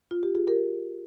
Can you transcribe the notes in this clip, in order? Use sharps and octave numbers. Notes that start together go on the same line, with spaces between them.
F4
G4
F4 G#4
G4 A#4